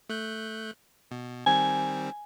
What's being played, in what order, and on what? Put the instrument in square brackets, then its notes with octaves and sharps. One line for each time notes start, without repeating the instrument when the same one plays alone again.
[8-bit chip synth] A3 F#6 G6
B2
[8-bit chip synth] D#3 G3 C4 [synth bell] G#5